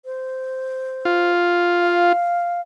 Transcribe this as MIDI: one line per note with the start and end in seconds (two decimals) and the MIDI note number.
0.05 1.31 72
1.05 2.13 65
1.82 2.61 77